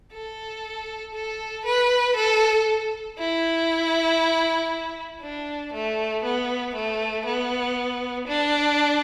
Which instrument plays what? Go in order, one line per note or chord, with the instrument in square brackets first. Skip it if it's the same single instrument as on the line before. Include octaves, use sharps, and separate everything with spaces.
[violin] A4
A4
B4
A4
E4
D4
A3
B3
A3
B3
D4